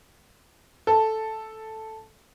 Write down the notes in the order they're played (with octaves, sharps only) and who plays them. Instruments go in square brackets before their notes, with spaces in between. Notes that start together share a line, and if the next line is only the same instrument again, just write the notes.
[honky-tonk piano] A4